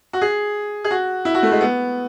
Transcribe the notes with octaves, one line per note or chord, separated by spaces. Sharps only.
F#4
G#4
G#4
F#4
E4
F#4
A3
G#3
B3